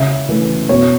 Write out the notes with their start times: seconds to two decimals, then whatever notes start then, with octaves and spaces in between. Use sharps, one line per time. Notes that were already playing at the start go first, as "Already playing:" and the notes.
Already playing: C#3 E5
0.29 E3 A3
0.69 B2 C#5